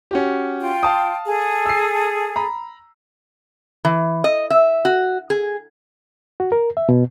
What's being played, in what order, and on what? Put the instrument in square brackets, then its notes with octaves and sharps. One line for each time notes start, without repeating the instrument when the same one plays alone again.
[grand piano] C#4 F#4 G4
[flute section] F4 G5
[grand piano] F5 A5 D#6
[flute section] G#4 A4
[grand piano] E6 C7
A#5 B5
[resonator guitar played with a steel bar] E3
D#5
E5
F#4
G#4
[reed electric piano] F#4
A#4
E5
B2